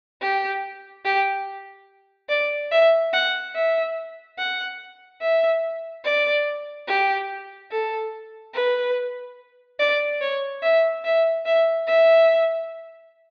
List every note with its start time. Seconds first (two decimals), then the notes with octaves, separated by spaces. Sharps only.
0.22 G4
1.05 G4
2.29 D5
2.71 E5
3.13 F#5
3.55 E5
4.38 F#5
5.21 E5
6.05 D5
6.88 G4
7.71 A4
8.54 B4
9.79 D5
10.21 C#5
10.63 E5
11.05 E5
11.46 E5
11.87 E5